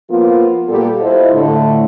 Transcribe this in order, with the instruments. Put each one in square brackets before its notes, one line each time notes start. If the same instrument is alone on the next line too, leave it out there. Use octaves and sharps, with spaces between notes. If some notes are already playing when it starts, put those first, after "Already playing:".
[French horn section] F3 A#3 B3 F4
A#2 G3 A#3 B3 G4 A4
E4 F4 G4 A4 C5 D#5
A2 D3 A3